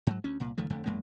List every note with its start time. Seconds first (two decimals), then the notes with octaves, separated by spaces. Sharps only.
0.07 G#2 F#3
0.24 D2 C#4
0.40 C2 A#2
0.58 C#2 D#3 F3 A3
0.70 F1 F2 D3 A3
0.86 A1 F#2 G#3 A#3